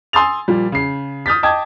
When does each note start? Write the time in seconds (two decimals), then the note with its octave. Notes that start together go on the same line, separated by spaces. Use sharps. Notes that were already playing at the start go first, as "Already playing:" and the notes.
0.13 G#5 C6 D#6 E6 A6 F7
0.48 A#2 F3 G3
0.72 C#3 C7
1.26 D#6 F6 G6 A6 B6
1.43 D#5 G5 A5 D6 D#6 G#6